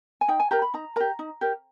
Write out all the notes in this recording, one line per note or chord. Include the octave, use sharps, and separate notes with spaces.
G#5
D#4 G5
G#5
G4 A#4 A#5
B5
D#4 A#5
G4 A#4 A#5
D#4
G4 A#4